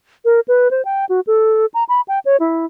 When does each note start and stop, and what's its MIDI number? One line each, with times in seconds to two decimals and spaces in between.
0.25 0.40 70
0.48 0.71 71
0.71 0.84 72
0.85 1.05 79
1.09 1.20 66
1.27 1.66 69
1.74 1.84 82
1.89 2.01 83
2.08 2.19 79
2.25 2.37 73
2.40 2.66 64